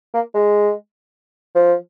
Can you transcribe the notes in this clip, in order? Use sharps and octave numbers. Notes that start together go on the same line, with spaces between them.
A#3
G#3
F3